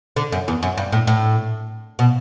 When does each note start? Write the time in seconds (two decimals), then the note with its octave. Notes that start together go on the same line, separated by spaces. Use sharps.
0.16 D3
0.32 F#2
0.48 E2
0.63 F#2
0.77 G2
0.92 A2
1.07 A2
1.99 B2